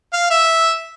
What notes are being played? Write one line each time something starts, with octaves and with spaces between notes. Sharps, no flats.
F5
E5